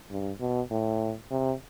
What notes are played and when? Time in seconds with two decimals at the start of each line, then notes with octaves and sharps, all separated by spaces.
0.11 G2
0.40 B2
0.70 A2
1.31 C3